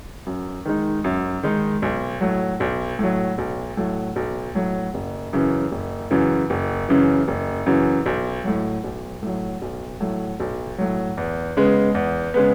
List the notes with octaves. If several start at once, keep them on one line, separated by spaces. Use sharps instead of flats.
F#2
D#3 G#3 D#4
F#2
D#3 G#3 D#4
B1
A2 F#3
B1
A2 F#3
B1
A2 F#3
B1
A2 F#3
F#1
F#2 C#3 E3
F#1
F#2 C#3 E3
F#1
F#2 C#3 E3
F#1
F#2 C#3 E3
B1
A2 F#3
B1
A2 F#3
B1
A2 F#3
B1
A2 F#3
E2
C#3 G#3 B3
E2
C#3 G#3 B3